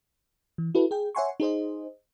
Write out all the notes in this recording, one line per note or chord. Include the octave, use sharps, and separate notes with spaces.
E3
E4 F#4 A4 B4
G#4 G5
C#5 E5 F#5 G#5 C6 C#6
D#4 G#4 C5 D#5